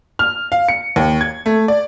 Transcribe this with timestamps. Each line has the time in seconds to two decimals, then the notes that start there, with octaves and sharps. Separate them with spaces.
0.19 F6
0.52 F5
0.68 C#7
0.96 D#2
1.21 G#6
1.46 A3
1.68 D5